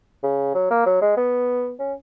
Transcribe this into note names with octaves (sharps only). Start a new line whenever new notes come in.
C#3
F#3
A#3
F#3
G#3
B3
C#4